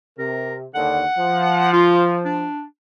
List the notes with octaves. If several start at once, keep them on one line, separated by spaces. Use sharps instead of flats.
C3 A#4
D#2 D3 F#5
F3
F4
D4